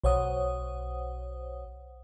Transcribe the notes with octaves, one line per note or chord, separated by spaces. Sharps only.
B1 C5 C#5 F#5 D#6